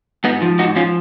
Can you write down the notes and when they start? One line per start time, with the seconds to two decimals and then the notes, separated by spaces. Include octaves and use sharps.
0.24 G#2 B3 D#4
0.42 F3
0.59 G#2 D#4 F#4
0.76 F3 C#4 F4